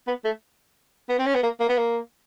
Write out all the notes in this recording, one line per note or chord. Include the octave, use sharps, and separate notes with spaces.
B3
A3
B3
C4
C#4
B3
A#3
A#3
B3
A#3